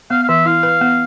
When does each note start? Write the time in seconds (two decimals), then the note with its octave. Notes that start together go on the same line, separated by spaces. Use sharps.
0.10 B3 F5
0.23 F5
0.29 E3 E5
0.45 E4 F5
0.63 B4
0.81 B3